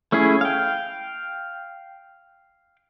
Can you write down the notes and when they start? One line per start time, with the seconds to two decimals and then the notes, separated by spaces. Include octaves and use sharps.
0.12 A3 C#4 E4 G#4
0.41 F5 G5